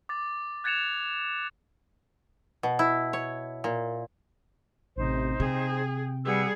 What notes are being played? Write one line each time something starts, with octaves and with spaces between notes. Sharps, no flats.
D6 A6
F#6 G#6 A6 C#7 E7 F7
B2
E4
C#5
A#2
A1 C3 D#4 C5
C3 G#4 G5
G3 G#4 B4 F#5 E6